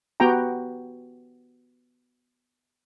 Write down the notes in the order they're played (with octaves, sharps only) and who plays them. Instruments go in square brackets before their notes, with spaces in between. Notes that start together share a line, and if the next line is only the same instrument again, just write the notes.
[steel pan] B3 F#4 G4 G5 A#5